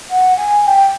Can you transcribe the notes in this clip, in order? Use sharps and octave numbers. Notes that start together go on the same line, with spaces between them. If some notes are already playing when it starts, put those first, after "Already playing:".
F#5
G#5
G#5
G5